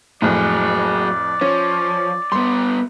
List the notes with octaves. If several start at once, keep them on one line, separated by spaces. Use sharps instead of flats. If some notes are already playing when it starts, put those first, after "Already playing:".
F2 A2 F#3 G#4 D5
F3 C#4
G3 B3 C6